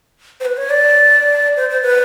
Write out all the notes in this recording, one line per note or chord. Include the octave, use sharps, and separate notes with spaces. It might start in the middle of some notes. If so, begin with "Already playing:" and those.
C5
B4
C#5
D5
C5
C5
B4